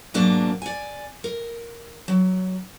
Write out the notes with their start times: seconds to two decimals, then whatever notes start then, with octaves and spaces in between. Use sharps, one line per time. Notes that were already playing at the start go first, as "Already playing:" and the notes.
0.14 G#2 B2 F#3 A#3 D4
0.62 D5 G#5
1.24 A#4
2.08 F#3